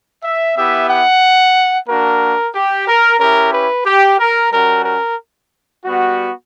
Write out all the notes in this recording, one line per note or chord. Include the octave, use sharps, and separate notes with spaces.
E5
B3 E4 G4 E5
F#5
A#3 D4 F#4 A#4
G4
A#4
C#4 E4 G4 A#4
B4
G4
A#4
G3 C#4 F#4 A#4
A#4
G3 B3 F#4